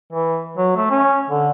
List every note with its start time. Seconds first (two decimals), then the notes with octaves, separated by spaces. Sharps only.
0.13 E3
0.57 F#3
0.77 A3
0.91 C#4
1.30 D3